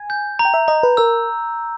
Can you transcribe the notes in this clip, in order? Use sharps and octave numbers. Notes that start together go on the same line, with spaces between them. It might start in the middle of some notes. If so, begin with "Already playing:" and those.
Already playing: G#5
G6
A#5
G5
E5
D#5 A#5
B4
A#4 E6